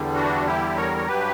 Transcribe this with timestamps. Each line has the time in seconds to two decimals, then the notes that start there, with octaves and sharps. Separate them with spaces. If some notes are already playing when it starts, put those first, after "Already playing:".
Already playing: E2 D3 G3
0.14 D4 F#4
0.46 E4 G4
0.76 A#4 C#5
0.97 C#5
1.07 G2 F#3 G4 B4